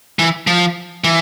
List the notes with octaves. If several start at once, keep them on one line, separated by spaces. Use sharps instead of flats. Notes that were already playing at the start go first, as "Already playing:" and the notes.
E3
F3
E3